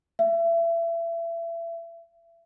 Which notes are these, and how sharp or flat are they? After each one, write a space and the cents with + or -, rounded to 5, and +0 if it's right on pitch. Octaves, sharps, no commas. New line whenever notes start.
E5 +30